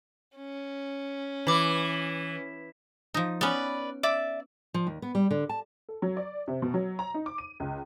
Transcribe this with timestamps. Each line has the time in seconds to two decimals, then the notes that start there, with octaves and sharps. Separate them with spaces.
0.36 C#4
1.47 E3 B5 D6
3.14 F3 D#4
3.41 B3 C#4 B4 D5
4.03 D5 E5 D6
4.74 F3
4.87 D#2
5.02 B3
5.15 G3
5.31 D3
5.49 A5
5.89 A4
6.02 F#3
6.17 D5
6.48 C3
6.62 B2
6.74 F#3
6.99 A#5
7.14 D#4
7.26 D6
7.38 D#7
7.60 C#2